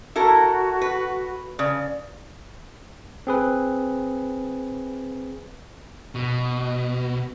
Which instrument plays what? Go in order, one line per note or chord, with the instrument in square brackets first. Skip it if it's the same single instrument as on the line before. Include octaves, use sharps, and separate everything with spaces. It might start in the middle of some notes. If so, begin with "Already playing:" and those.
[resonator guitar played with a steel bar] E4 A4 A#4 [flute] F#4
[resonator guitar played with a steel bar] B4
[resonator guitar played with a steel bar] C#3 [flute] D5
[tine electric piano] C4 G#4 B4
[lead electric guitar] B2